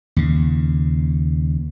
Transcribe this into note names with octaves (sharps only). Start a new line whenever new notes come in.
D#2 C#3